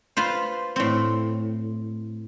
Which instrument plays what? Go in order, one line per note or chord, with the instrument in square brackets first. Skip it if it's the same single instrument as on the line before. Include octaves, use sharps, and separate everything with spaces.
[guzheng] F4 B4 C5
A2 C4